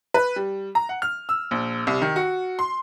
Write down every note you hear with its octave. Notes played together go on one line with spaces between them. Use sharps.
B4
G3
A#5
F#5
F6
E6
A#1
C2
D#3
F#4
C6